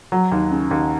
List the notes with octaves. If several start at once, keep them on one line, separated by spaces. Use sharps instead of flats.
F#3
D#2
C#3
D#2